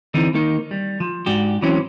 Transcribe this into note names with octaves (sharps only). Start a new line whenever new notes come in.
D3 E3 C4 D#4
D#3 A#3 D#4
G3
F3
G#2 D4 F#4 G4
E3 F#3 C4 C#4